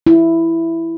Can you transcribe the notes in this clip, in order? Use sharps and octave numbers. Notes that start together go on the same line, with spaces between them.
E4